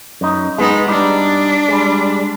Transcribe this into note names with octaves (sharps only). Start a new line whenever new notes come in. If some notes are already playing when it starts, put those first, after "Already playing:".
F#2 D#4
G#3 B3 D#4
G3 D4 D#4
G3 G#3